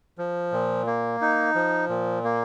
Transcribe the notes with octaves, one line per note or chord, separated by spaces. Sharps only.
F3
A#2
A#3
D#4
F3
A#2
A#3